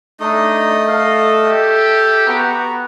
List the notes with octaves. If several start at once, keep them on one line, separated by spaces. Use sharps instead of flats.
A3 D4 D#4 D#5
A4 F5
G4 E5
B3 F#4 A#5